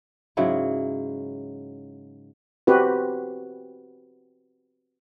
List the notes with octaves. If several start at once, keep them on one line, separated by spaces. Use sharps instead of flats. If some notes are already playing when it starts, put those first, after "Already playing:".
G#2 C#3 F#3 E4
C4 F#4 G4 B4